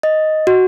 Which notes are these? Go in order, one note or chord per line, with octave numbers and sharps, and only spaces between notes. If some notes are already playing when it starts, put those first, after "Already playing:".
D#5
F#4